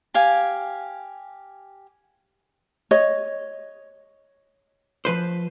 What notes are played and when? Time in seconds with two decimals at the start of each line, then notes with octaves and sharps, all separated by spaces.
0.14 G4 F5 G#5
2.91 C#5 D#5
5.05 F3 B4 C5